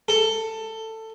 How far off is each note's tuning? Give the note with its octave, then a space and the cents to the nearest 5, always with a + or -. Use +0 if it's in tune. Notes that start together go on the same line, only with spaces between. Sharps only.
A4 +15